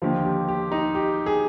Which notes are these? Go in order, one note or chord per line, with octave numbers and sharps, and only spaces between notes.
D#2 D3 F3 F4
G4
G4
D#4
G4
G#4